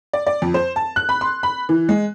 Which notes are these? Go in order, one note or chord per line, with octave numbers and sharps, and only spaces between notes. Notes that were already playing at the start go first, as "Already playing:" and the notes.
D5
D5
F2
C5
A5
F#6
B5
C6
B5
E3
G#3